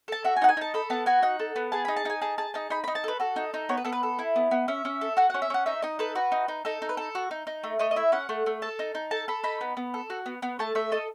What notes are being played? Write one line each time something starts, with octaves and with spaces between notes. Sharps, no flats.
A4 A5
F#4 E5
G#5
D#4 F#5
G#5
D#4 A5
A4 B5
B3 A5
F#4 G#5
D#4 F#5
A4
B3
G#4 A5
D#4 B5
A5
D#4 G#5
G#4 A5
G#4 A5
D#4 A5
D#4 B5
D#4 B5
A5
A4 B4
F#4 A4
D#4
D#4
B3 C#5
B4
B3 A4
B4
A4
E4
B3
B3
C#4 E5
C#4
A4
F#4 F#5
C#4 F#5
E5
C#4 F#5
D#4 E5
D#4 D#5
A4 B4
F#4 B4
D#4
D#4
D#4 A4
D#4
B4
A4
F#4
D#4
D#4
A3
A3 D#5
D#5
E4 E5
C#4 F#5
A3
A3
A4 A5
D#4
D#4
A4 A5
A4 B5
D#4 B5
B3
B3
A4
F#4
B3
B3
A3 A5
A3 E5
A4 D#5